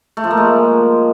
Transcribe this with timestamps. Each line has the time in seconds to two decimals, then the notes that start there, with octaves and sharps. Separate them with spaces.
0.17 A3
0.24 F3
0.31 A#3
0.37 G#3